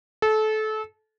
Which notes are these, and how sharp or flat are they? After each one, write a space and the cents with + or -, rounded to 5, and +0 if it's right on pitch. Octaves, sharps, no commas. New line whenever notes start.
A4 -25